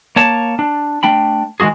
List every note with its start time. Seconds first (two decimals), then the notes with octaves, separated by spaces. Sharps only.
0.16 A#3 C#5 A5
0.59 D4
1.03 A3 D4 G5 B5
1.60 D#3 G#3 A#3 F#4 G#4